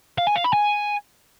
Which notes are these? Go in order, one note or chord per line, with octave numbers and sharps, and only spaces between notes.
F5
G#5
F5
B5
G#5